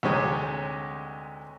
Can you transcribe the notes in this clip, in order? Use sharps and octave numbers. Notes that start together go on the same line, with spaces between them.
D2 C3 G#3 D#4 G4 C#5